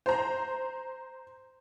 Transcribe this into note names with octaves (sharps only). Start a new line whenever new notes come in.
C5 A#5